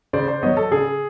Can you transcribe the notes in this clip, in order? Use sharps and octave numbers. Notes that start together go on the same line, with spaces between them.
C#3 C5 D5
C5 D5
F#3 B3 C#5 D#5
A4
C#3 G#4